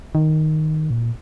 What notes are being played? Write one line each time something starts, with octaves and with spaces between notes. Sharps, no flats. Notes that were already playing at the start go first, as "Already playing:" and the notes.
D#3
A#2